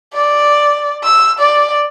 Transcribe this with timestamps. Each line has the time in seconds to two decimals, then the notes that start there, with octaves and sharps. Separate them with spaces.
0.13 D5
1.03 E6
1.39 D5